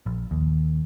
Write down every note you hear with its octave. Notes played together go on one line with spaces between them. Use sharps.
A#1
D#2